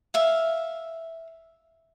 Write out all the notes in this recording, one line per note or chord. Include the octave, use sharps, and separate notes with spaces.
E5 F5